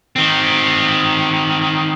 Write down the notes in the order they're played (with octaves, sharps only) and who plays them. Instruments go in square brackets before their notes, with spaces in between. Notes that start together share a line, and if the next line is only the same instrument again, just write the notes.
[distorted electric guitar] D#3 C4